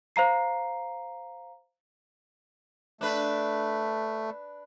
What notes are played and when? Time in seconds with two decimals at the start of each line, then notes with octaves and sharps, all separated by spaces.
0.16 C5 F5 A#5 C7
3.01 A3 D4 B4